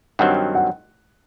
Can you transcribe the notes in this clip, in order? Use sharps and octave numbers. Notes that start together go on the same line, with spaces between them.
G2 D#3 F#3 C4 F#5
F#5